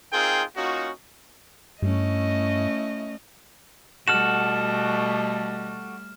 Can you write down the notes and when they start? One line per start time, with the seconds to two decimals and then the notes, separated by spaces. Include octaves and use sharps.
0.13 C4 D#4 F4 G#4 A#4 G5
0.57 A#3 C#4 D#4 F4 F#4
1.82 G2 A3 C#4 E4 D#5
4.08 B2 G3 A3 F#4 A4 F#5 F6 E7